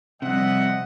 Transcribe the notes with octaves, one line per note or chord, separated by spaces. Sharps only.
C3 F3 G3 D#5 E5 F#5